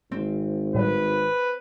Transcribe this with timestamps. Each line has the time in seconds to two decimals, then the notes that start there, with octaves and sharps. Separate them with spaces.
0.12 G#1 C4
0.75 A2 G3 B4